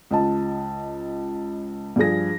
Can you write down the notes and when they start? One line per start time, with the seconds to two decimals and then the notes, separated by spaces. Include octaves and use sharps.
0.11 C#2 D#5 A5
1.96 G2 F3 G#4 A#6